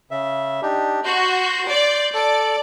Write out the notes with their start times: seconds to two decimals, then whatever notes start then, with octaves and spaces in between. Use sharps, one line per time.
0.11 C#3 E5
0.62 D4 D#4 G4
1.06 F#4 C6 G6
1.68 D5
2.14 A4 D5